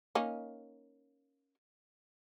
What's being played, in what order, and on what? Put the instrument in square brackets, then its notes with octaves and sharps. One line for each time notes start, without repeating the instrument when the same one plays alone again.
[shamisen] A#3 C#4 D#4